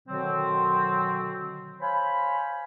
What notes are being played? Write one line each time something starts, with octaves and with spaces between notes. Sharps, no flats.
B2 D3 D#3 F#3 C4
C5 C#5 F5 G#5 B5